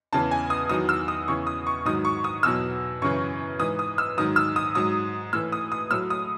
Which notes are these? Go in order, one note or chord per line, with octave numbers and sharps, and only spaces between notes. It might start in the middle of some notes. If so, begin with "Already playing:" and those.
E2 C#3 E3 A5
G#5
D#6
E2 D#3 F#3 D#6
E6
D#6
E2 C#3 E3 C#6
D#6
C#6
G#2 D#3 F#3 D#6
C#6
D#6
E2 B2 F#3 E6
F#2 C#3 E3 C#6
G#2 E3 D#6
D#6
E6
G#2 D#3 F#3 D#6
E6
D#6
G#2 F#3 D#6
A2 E3 E6
D#6
D#6
A2 F#3 E6
D#6